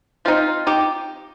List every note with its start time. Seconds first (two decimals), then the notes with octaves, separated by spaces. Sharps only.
0.25 F3 C4 D#4 F4
0.67 D#4 G4